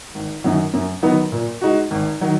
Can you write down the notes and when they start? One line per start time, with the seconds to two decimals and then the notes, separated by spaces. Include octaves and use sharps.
0.15 G#1
0.44 F#2 D#3 F#3
0.73 F#2
1.03 D#3 F#3 B3 D#4
1.32 A#2
1.61 G#3 D#4 F#4
1.91 G#1
2.21 D#3 F#3